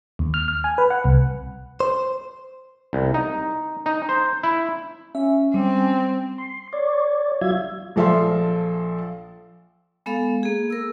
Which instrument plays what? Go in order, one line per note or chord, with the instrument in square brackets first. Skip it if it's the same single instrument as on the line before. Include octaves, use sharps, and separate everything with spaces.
[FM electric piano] D#2
F6
F6
G#5
B4
F#5
C2
[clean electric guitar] C5
[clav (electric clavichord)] C2
D#4
D#4
C5
E4
[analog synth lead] C#4 [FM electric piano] E5
[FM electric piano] G3 [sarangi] C4
[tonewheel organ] C6
C#5 D5
F#3 F4 E5 G#6
[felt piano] A#1 F3 A4 E5 F5 C6
[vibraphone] G#3 B3 A4 F5
A#3 G#4
A#4 E6